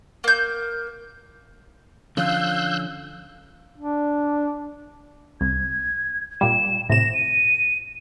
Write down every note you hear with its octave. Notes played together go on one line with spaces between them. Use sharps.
A#3 G6
D3 F3 C#4 F5 E6 F#6 G6
D4
C2 G#6
A#2 G3 E7
A2 C3 A#6 E7
D#7